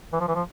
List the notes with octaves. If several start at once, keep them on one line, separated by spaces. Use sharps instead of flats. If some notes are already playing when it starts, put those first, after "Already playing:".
E3
F3
E3
F3